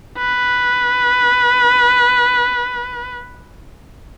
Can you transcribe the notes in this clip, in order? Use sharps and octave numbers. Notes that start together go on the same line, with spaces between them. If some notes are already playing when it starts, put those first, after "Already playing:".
B4